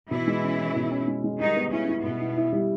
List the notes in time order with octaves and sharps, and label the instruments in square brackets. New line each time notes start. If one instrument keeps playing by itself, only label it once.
[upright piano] B2 [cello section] E3 E4
[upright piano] G#3
C#4
C#4
B2
C#4
G#3
G#3
[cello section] D#3 D#4 [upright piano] G3
[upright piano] B3
[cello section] C#3 C#4 [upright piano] E4
[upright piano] E4
[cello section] B2 B3 [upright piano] E4
[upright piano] E4
E4
G3